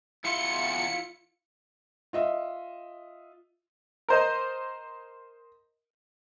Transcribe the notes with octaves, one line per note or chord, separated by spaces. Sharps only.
E2 E4 F4 C6 C#7
F4 D#5 E5
A#4 C5 D#5